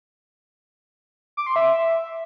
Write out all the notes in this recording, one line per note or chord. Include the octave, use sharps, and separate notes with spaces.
D6
C6
E5